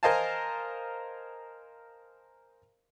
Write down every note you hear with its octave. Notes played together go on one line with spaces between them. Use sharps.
A#4 C5 D#5 F5 G#5 A5